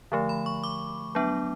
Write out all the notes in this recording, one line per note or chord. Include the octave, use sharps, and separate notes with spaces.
D3 F3 A3
B5
C#6
D6
F#3 B3 D4